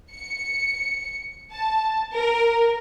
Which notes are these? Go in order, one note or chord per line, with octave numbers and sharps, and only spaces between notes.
C#7
A5
A#4